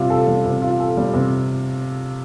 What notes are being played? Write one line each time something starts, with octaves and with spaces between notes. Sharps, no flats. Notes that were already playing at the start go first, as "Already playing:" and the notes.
Already playing: C3 G3 F4
A4
G3
C3
F4
A4
G3
C3